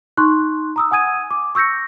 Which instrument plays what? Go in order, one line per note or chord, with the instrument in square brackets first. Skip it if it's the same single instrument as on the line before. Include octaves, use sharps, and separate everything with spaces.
[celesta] D#4 C6 C#6 F#6
A#5 D#6 E6
F#5 G#5 D#6 G#6 D#7
D6
C#6 E6 G6 A#6 C#7